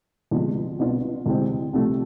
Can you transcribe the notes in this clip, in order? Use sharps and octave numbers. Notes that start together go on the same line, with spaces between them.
D2 C3 F3 G#3 B3
C2 B2 B3 D4 F4
D2 C3 E3 G#3 C4
C2 C3 F3 A3